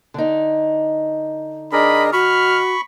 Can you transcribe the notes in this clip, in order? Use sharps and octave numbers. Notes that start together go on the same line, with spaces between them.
D3 D#4
D4 G#4 A#4 D#5 B5
F#4 B5 C#6 F6